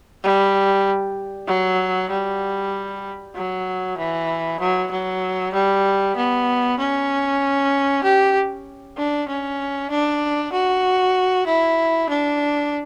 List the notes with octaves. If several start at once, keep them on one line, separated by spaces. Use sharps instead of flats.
G3
F#3
G3
F#3
E3
F#3
F#3
G3
B3
C#4
G4
D4
C#4
D4
F#4
E4
D4